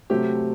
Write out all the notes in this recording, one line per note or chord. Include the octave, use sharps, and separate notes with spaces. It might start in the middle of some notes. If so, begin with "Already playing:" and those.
C3 F#3 A3 C4 G4